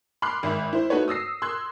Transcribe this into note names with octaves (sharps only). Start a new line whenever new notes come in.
B5 C6 D6 F6 F#6 C7
G#1 E5 B5
E4 C5
A3 D#4 F#4 A4 B4 C#5
D#6 E6 A#6 C7
C6 E6 F#6 G#6